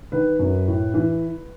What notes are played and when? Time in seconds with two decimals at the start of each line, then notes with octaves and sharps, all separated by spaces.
0.12 D#3 B4
0.39 F#2
0.67 A2
0.94 E3